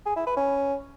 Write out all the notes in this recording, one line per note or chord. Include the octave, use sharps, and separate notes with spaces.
G#4
E4
B4
C#4